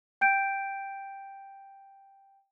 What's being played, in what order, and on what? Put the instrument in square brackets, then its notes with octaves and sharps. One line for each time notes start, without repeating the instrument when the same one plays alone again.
[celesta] G5 G6 D7